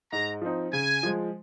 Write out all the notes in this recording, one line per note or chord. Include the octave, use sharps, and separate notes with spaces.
G#2 A#5
F3 C4 D#4
C#3 G#5
F3 G#3